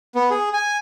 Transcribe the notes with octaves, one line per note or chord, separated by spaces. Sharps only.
B3
G#4
G#5